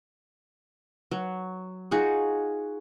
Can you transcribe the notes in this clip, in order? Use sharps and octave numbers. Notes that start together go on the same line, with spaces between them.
F#3
D#4 F4 F#4 G#4